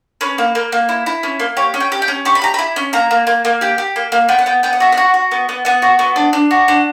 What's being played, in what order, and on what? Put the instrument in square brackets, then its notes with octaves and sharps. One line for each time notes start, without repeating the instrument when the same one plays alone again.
[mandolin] C#4 B4
A#3
A#3
A#3
E4
E4
C#4
A#3
G4 C#5
C#4
G5
G4
G5
C#4
G4 C#6
B5
G4 A#5
E4 B5
C#4
A#3 A#5
A#3
A#3
A#3
G4 G5
G4
A#3
A#3
B3 G5
F#5
B3 G5
B3 G5
F#5
F#4 E5
F#5
F#4
F#4
B3
B3
B3 F#5
F#4
B3
D4
D4
F#4
D4